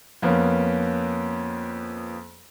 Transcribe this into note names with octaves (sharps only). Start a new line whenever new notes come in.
F2 A#3 B3 C#4